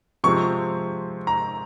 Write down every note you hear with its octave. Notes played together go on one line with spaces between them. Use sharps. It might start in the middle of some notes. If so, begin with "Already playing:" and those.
C3 F3 G#3 C4 C#6
A#5